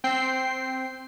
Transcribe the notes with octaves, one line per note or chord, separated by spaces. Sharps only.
C4 G5 C7